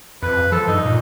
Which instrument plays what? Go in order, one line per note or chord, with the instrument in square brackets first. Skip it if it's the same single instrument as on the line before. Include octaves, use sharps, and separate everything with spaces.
[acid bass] F2 [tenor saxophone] B4
[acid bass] F3 [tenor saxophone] A4
[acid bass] G2 [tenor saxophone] D#4
[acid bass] A#2